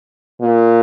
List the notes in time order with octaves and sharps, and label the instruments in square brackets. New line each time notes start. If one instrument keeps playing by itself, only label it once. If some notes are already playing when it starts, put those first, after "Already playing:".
[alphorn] A#2